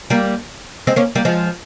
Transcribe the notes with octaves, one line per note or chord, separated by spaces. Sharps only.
G3 A#3
G#3 C4
A#3 C#4
G3 A#3
F3 G#3